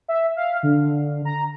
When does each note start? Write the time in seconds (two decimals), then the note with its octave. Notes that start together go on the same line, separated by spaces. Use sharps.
0.08 E5
0.36 F5
0.63 D3
1.25 A#5